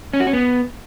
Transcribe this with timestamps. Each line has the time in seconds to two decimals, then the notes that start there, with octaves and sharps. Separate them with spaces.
0.13 C#4
0.20 F#4
0.27 C#4
0.33 B3